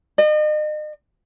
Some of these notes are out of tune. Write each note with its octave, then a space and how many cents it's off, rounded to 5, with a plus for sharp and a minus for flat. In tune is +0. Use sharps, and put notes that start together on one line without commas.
D#5 -40